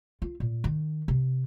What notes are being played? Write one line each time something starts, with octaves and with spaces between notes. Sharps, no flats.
F4
A#2
D#3
C3